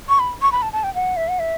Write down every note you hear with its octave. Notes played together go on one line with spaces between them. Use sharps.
C#6
B5
C#6
B5
A5
A5
G5
F#5
E5
F#5
E5